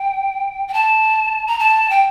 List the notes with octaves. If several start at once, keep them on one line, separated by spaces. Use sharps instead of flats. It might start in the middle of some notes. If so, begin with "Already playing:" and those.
Already playing: G5
G5
A5
A#5
A5
G5